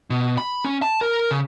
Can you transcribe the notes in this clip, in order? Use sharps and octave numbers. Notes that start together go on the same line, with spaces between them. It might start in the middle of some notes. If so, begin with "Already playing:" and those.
B2
B5
C#4
A5
A#4
C#3